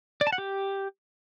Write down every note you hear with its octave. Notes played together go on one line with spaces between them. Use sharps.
D5
A5
F#5
G4